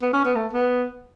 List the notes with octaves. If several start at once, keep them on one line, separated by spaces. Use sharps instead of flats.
B3
C#4
B3
A3
B3